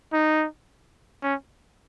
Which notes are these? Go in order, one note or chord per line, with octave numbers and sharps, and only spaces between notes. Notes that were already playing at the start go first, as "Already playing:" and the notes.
D#4
C#4